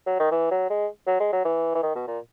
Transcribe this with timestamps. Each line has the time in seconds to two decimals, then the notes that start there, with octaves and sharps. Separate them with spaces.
0.06 F#3
0.19 D#3
0.31 E3
0.51 F#3
0.69 G#3
1.07 F#3
1.20 G#3
1.32 F#3
1.44 E3
1.74 E3
1.82 D#3
1.95 B2
2.07 A#2